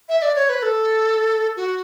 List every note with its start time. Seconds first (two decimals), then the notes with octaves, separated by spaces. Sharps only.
0.09 E5
0.22 D5
0.35 C#5
0.49 B4
0.63 A4
1.57 F#4